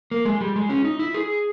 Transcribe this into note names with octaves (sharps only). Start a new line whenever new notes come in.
A#3
G#3
G3
G#3
C#4
D#4
E4
G#4